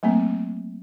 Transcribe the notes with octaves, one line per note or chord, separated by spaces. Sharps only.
F#3 A3 A#3 C4